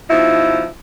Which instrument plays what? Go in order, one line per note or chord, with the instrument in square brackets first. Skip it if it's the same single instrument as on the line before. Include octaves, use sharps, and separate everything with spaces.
[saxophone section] B2 F3 D#4 E4